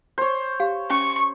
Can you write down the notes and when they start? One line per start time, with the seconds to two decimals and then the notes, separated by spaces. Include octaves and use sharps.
0.18 C5 C#5
0.60 G4 F5
0.90 C#4 C#6